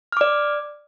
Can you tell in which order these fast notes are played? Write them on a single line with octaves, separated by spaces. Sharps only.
F6 D6 D5